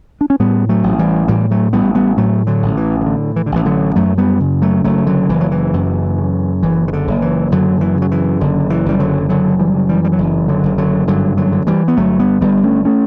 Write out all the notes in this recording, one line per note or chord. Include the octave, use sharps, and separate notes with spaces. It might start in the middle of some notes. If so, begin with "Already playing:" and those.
D4
C#4
A2 G3 B3
F#3 A3
A1
E3 G3
A2 E3 G3
F#3 A3
A1 G3 B3
G3 B3
A2 F#3 A3
D3 F#3
A1
E3
E3
A2 D3
E3
D3
A1 E3
D3 F#3
F#2 F#3 A3
G3 B3
C#3
F#3 A3
F#1 F#3 A3
D3 F#3
F#1 E3
F#3
E3
F#2
C#3
F#1 E3
E3
D3
F#1
E3
F#2 D3 F#3
D3
E3
C#3
F#3
E3
F#1 D3
E3
F#1 G3
D3 F#3
F#2 D3 F#3
E3 G3
C#3
E3 G3
G3
F#3
F#1 E3
D3 F#3
F#1
D3 F#3
G2 D3 F#3
D3 F#3
D3
E3 G3
B3
G1 F#3 A3
G3 B3
G1 G3 B3
A3 C#4
A3 C#4